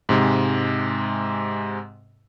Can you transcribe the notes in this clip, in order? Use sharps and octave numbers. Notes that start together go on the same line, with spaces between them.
G#2 C3 G#3